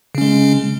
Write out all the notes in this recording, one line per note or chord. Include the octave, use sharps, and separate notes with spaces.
C#3 G#3 C#4